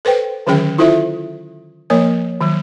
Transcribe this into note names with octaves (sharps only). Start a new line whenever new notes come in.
A4 B4 C5 G5
D3 D#3 F#3 C#4 G#4 G5
E4 F4 A4 C5 E5
F3 A#3 A#4 C#5
D#3 F#3